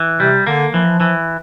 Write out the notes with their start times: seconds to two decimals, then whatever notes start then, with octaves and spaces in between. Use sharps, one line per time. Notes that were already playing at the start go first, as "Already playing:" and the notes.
Already playing: E3
0.19 C3 G3
0.47 D3 A#3
0.73 E3 F3
1.00 E3